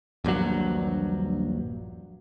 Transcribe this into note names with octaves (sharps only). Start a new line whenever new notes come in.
D#1 A#1 G2 F#3